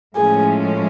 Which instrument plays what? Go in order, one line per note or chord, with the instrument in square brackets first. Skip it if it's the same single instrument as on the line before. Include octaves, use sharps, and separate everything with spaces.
[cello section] A2 F3 G#3 C#4 [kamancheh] G#4